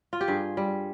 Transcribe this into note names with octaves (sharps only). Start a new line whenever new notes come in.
F4
G4
G2 G#4
G3